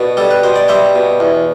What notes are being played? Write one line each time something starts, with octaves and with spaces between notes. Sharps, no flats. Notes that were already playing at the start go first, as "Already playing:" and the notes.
Already playing: B2 B4 D5
G3 A4
B4
B2 C5
D5
G3 C5 E5
B2
E2